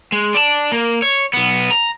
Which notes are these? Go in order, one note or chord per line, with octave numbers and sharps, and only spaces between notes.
G#3
D5 A5
A#3
C#5
B1 B3
A#5